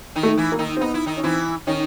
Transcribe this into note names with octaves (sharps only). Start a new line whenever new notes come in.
D#3 D#4
A3
E3 E4
A#3
D#3 D#4
C4
B3 D#4
E4
D#3 D#4
C#4
E3 C4 E4
D#3 C#4 D#4